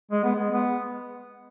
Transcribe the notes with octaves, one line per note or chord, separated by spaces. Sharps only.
G#3
B3
G#3
B3